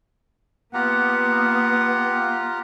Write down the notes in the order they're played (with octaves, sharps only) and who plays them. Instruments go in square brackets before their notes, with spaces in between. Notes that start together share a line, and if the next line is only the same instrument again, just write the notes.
[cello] A#3 B3 [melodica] F4 G4 A#5 [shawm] F#5